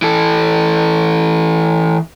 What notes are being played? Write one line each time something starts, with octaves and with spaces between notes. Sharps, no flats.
E3 A4